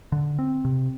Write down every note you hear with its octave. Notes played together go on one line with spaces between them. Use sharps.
D3
C4
C3